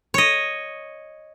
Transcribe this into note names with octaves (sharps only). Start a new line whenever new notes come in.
C#5 D#5